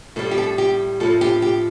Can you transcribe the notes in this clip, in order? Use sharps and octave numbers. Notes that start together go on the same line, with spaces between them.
A2 G3 A4
G4
A4
G4
A2 F3 A4
G4
G4